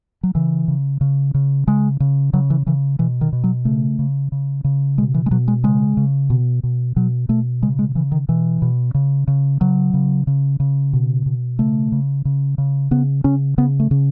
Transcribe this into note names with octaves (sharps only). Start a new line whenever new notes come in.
F#3
C#3 E3
C#3
C#3
C#3
C#3 G#3
C#3
C#3 F#3
E3
C#3 E3
B2 E3
D#3
B2
F#3
C#3 A3
C#3
C#3
C#3
B2 G#3
E3
G#3
B2 F#3
G#3
C#3 G#3
C#3
B2
B2
B2 F#3
B2 A3
C#3 G#3
G#3
C#3 E3
D#3
B2 E3
B2
C#3
C#3
C#3 F#3
C#3
C#3
C#3
B2
B2
C#3 A3
C#3
C#3
C#3
C#3 B3
C#3 C#4
C#3 B3
A3
C#3